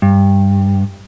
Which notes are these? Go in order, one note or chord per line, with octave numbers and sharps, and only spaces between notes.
G2